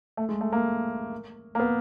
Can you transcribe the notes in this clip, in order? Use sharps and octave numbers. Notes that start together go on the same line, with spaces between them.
A3
G#3
A3
A#3
A#3
B3